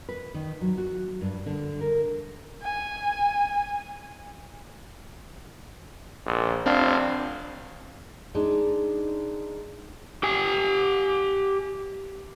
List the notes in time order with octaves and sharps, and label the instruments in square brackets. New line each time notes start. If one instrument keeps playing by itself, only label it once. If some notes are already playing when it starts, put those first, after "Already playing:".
[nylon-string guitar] B4
D#3
F#3
F#4
G2
D3
A#4
[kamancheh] G#5
[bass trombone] A#1
[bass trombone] F1 [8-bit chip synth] C4 D4 F5
[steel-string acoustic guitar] G#3 D4 D#4
[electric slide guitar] G4 G#5